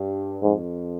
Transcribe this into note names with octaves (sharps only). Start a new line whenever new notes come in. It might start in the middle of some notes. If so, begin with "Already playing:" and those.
Already playing: G2
F2 G#2